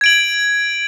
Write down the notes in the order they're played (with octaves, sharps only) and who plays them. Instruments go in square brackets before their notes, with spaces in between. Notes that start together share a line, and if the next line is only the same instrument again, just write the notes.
[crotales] G#6 D7 F#7